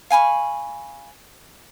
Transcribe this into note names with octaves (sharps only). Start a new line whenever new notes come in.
F5 G#5 B5 C#6